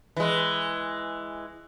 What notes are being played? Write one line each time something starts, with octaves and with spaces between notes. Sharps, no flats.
E3 G#3